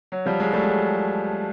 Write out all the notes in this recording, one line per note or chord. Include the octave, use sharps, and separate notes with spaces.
F#3
F3 G3
F#3 G#3
G3 A3
F#3 G#3